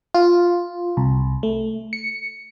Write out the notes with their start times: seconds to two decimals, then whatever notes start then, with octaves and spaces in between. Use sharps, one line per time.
0.14 F4
0.97 C2
1.43 A3
1.93 C#7